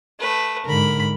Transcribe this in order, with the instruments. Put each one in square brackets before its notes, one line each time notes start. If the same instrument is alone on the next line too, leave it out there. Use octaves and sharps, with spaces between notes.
[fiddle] A3 B4
[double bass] G#2 D3 [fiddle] A#4 B5